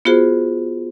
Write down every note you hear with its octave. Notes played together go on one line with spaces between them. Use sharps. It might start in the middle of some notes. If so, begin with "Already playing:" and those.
B3 F4 F#4 G#4 C5